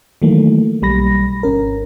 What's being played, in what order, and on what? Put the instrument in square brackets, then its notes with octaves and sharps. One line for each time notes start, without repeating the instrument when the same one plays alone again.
[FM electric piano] D#3 E3 F#3 A3 A#3
B1 G3 B5 A#6
G#1 C#4 A#4